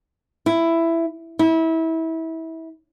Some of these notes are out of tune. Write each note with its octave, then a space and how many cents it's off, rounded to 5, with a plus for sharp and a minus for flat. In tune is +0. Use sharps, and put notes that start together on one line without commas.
E4 +10
E4 -25